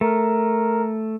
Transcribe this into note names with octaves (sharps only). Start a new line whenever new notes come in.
A3 A#4